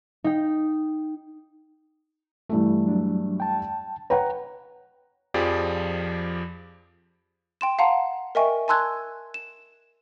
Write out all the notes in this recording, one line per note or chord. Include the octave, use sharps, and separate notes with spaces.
D#4 G5
G2 E3 A3
F#3 D4
G5 A5
B4 C#5 F#5 G5 A#5
F2 F3 G4 G#4 D5
G5 C6 E7
F5 F#5 A5 A#5 C6
A#4 D#5 E5 G5 G#5 C#6
G#5 A5 C6 E6 F#6 G#6
E7